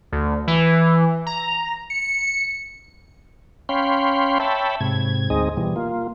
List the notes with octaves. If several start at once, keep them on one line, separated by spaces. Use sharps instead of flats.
D2
E3
A#5
C#7
C#4 C#5 F5 G5 B5 C6
C#5 E5 G5 A5 B5
G#2 C3 G#6
D2 G#3 C4 D#4 G#4 D#5
B2 E3 G3
A#3 F4